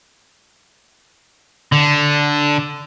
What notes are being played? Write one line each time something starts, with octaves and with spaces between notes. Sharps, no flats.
D3